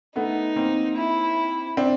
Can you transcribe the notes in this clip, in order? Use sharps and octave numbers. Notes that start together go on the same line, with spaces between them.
A3 B3 D#4
A#3 C4
E4
C4 D4